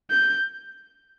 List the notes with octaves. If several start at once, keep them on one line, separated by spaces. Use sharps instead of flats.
G6